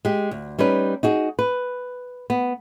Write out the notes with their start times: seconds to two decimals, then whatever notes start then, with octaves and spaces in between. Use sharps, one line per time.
0.05 G#3 G4
0.31 D2
0.59 G3 C#4 D#4 B4
1.03 D#4 F#4 G#4
1.39 B4
2.30 B3